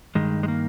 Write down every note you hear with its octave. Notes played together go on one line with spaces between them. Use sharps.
G2 D#3 G#3
G#3
A#3